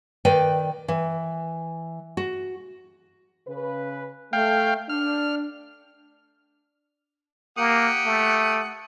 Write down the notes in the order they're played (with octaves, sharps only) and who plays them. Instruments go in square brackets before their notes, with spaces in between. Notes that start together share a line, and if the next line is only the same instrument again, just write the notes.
[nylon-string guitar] D#3 B4 D5 G5
E3
F#4
[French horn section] C#3 B4
[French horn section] A3 [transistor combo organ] F5 G5
[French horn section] D4 [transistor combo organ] F6
[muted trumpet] A#3 [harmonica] G4 F#5 D#6
[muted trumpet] A3